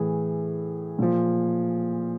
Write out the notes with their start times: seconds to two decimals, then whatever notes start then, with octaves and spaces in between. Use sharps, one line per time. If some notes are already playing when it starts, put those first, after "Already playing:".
Already playing: A2 E3 G#4
0.99 A#2 F3